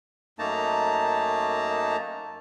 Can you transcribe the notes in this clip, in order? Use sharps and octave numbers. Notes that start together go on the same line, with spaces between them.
F#2 A3 A#3 D#4 A5 A#5